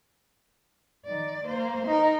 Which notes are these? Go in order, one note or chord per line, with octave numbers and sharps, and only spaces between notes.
D#3 D5
A#3 C5
D#4 A#4